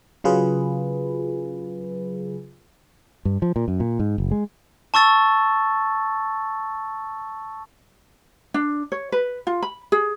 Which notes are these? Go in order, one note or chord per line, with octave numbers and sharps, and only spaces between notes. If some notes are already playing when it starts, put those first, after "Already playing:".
C#3 F#3 F4 G#4 B4
G2
F3
A#2
F#2
A#2
G#2
F#1
G#3
A5 C#6 E6 A6
D4
C#5
B4
F4
B5
G#4